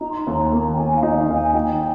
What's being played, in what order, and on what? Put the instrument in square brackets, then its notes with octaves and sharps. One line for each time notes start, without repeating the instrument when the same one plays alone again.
[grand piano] D#4 [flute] A#5
[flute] C6
A#5
[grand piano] D#2
[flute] A#5
[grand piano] A#3
[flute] A#5
G5
[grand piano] D#3 [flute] G#5
[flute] F5
[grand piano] D#4
[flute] D#5
F5
[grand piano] D#2
[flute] G#5
[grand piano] D#4 [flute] G5